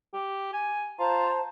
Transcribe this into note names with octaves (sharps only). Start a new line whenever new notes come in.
G4
G#5
F4 C5 A5 A#5